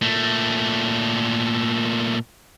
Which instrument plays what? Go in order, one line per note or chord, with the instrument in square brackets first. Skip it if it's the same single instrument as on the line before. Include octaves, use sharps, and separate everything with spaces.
[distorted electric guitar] A#2 A3